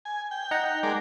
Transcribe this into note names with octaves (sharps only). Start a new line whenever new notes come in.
G#5
G5
D#4 F#5 A#5
G#3 A#4 D5